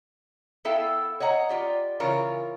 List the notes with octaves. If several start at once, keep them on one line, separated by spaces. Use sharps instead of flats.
B3 E4 A4 E5 F5 G5
C#5 D#5 F#5 A#5
F4 G4 D5
C#3 E3 F4 A#4 C#5